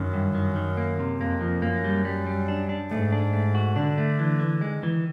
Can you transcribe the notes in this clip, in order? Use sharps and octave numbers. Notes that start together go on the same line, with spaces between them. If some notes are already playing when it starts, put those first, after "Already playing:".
Already playing: F#2 D#3
G2
D#3
D#3
A#3
C3
F2 A#3
F3
F#2 A#3
G3
G3
G3
D4
D4
G#2 A3
D4
A3
F#4
D3 D4
A3
E3
E3
D#3 G#3
E3